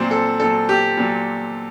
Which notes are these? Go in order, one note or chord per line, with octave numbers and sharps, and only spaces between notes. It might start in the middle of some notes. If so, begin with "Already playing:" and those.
Already playing: A#2 F#3 C4 C5
A4
A#2 F#3 A4
G4
A#2 F#3